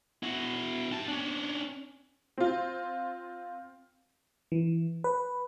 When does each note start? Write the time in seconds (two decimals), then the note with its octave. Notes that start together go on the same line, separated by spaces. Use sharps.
0.23 E4 F#4
0.91 G4 A5
1.08 C#4 D4
2.38 C4 F4
4.52 E3
5.04 B4